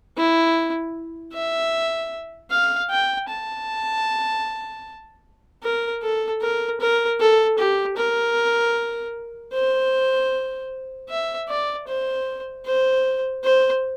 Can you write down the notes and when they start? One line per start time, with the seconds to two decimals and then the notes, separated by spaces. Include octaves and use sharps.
0.17 E4
1.34 E5
2.51 F5
2.91 G5
3.29 A5
5.63 A#4
6.02 A4
6.42 A#4
6.81 A#4
7.20 A4
7.58 G4
7.97 A#4
9.53 C5
11.10 E5
11.49 D5
11.87 C5
12.66 C5
13.44 C5